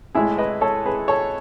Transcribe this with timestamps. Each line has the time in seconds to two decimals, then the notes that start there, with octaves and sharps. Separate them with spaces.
0.15 A2 G#3 E4 G#4
0.38 B4 D#5
0.61 A4 C#5
0.86 G#4 B4
1.08 A4 C#5